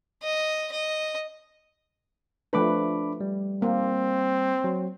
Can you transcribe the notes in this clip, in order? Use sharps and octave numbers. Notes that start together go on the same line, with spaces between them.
D#5
D#5
F3 A3 D4 B4 B5 D6
G3
A#3 C4
F#3